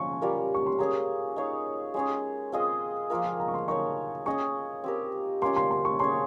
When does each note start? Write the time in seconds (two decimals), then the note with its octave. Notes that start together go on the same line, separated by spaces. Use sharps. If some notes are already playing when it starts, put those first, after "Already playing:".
Already playing: F3 C#4 C6 C#6
0.22 G3 A#3 F4 A#4
0.55 C#6
0.66 C6
0.79 A#3 C#4 G#4 C#5 A#5
1.36 D#4 G#4 C#5 F5
1.94 G#3 C#4 G#4 C#5
2.52 C4 F4 G#4 D#5 G#5
3.10 F3 A#3 F4 A#4
3.25 G#5
3.39 A#5
3.48 C#6
3.54 C6
3.68 D#4 A#4 C#5 C#6
4.26 C#4 G#4 D#5 C#6
4.84 C4 G4 A#4
5.42 A#3 C#4 F4 C6
5.56 C6
5.71 C6
5.85 C#6
5.99 C#4 G#4 C#5 C6